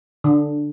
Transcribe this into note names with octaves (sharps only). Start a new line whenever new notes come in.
D3